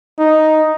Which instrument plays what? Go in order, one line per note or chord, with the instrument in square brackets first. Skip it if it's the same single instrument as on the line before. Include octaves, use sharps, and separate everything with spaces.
[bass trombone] D#4